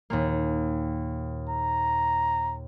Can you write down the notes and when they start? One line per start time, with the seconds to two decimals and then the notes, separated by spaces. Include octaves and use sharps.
0.10 D#2 A#2 A#3
1.49 A#5